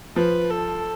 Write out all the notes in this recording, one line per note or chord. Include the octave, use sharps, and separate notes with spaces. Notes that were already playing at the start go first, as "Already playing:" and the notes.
F3 B4
A4